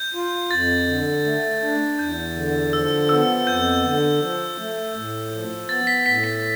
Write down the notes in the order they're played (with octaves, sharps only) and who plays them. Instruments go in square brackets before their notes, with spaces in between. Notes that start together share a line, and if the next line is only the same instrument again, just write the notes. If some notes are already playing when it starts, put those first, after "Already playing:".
Already playing: [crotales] G6
[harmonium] F4
[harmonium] F2 [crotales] A6
[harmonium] D3
A3
D4
[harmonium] E2 [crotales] G6
[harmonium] D3
[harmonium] F3 [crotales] E6
[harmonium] B3 [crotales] E6
[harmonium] F2 [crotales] G6
[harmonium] D3
F3
A3
A2
F3
[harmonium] B3 [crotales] A6
[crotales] B6
[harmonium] A2 [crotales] B6
[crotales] B6